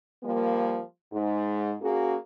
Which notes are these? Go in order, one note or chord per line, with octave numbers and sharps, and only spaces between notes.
F3 G3 A#3
G#2
A#3 C#4 F#4 G#4